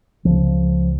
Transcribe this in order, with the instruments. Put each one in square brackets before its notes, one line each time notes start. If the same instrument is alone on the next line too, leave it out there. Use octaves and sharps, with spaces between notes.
[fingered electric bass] C#2 C#3 F3